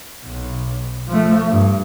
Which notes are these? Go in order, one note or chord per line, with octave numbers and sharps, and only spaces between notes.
B1
F3 A3
G2